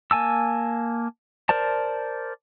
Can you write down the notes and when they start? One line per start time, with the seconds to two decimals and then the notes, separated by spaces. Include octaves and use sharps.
0.11 A#3 G#5 A5 E6
1.49 A#4 C5 D5 A5